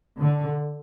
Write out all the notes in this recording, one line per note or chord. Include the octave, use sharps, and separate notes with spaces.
D3